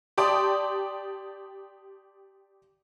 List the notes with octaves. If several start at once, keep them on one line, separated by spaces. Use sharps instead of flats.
G4 D5 G5 A5 C6 D#6